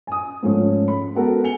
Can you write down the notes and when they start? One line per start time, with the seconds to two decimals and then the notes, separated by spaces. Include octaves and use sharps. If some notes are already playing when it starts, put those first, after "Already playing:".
0.07 G#5 D#6
0.43 G#2 F3 A3 C#4
0.88 B5
1.15 G#3 B3 F#4 A4 A#4 F#5
1.44 G#5 C#7 F7 G7